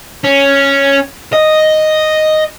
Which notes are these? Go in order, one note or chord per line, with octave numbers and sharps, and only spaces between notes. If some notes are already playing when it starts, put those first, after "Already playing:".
C#4
D#5